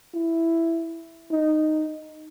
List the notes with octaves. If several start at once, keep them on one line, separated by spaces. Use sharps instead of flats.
E4
D#4